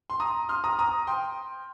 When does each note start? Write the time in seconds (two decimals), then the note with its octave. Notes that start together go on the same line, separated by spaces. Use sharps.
0.10 C6
0.20 A#5 D#6
0.49 C6 F6
0.64 A#5 D#6
0.79 A#5 D#6
1.07 G5 C6